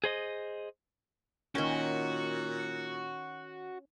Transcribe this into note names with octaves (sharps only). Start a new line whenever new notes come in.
G#4 C5 D#5
A#2 D#3 C#4 F#4 G5